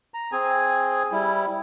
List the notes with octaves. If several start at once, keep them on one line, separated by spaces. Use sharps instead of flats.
A#5
C4 G#4 G#5
G3 E4